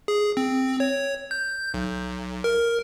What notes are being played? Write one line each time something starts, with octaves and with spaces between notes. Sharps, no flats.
G#4
C4
C#5
G6
B1
A#4